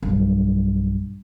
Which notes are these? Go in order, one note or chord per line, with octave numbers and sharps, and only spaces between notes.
B1 G2